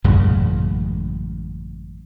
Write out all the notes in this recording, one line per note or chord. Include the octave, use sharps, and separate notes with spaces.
A1 F#2 C#3 G#3